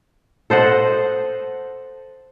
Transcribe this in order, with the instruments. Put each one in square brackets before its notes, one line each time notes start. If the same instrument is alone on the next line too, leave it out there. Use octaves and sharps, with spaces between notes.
[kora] A4 C5 D#5 F#5